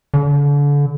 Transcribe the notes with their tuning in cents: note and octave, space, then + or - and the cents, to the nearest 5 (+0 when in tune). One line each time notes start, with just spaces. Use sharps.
D3 -35